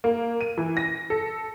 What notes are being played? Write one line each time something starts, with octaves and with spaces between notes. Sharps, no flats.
A#3
D#7
E3
A#6
A4